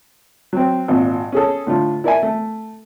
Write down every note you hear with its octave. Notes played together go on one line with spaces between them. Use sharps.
F#3 C4
G#1 A#2
C#4 G#4 A4
A2 D3 F4
E4 A#4 D5 E5 G#5
A3